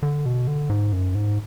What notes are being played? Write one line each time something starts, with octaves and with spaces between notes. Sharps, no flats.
D3
B2
D3
G#2
F#2
G#2